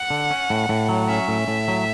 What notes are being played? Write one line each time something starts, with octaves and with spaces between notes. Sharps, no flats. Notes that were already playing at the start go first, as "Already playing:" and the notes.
Already playing: F#5
D3
C#4
A2
A2
F#3
C#4 E5
A2
A2
F#3